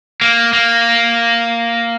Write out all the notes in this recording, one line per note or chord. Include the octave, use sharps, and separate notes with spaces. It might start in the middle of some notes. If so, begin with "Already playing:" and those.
A#3
A#3